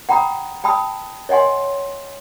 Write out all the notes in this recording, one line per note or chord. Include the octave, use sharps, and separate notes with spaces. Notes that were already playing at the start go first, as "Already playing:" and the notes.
F#5 G5 A#5 B5 D#6
G5 A5 B5 D#6 E6
C#5 D#5 F#5 G#5 C6